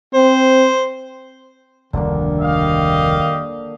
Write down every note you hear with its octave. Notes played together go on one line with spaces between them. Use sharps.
C4 C5
F1 D2 D3 D#3 G3 A#3 D4
G4 D#5 F5